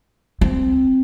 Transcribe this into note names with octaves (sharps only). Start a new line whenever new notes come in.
C4